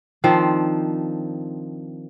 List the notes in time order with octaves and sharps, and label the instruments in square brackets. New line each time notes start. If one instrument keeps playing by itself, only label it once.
[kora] D#3 F3 C4 D4